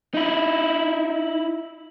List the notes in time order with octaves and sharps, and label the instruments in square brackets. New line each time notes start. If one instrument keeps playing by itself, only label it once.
[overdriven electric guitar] D#4 E4